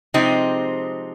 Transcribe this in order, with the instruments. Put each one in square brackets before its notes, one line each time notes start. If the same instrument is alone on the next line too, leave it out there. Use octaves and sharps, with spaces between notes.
[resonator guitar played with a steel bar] C3 F3 G#3 C4 D#4